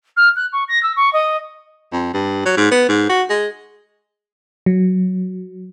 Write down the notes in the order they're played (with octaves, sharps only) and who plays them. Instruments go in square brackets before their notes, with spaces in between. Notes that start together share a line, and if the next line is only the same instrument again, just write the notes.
[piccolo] F6
F#6
C#6
A#6
E6
C#6
D#5
[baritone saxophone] F2
G2
F#3
G#2
B3
G#2
F#4
G#3
[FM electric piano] F#3